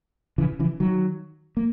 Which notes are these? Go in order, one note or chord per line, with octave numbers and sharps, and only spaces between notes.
C#3 E3
C#3 E3
D#3 F#3
A#3